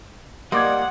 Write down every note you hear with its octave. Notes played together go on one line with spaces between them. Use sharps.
G3 A#3 D5 D#5 F#5 C6 D6 G#6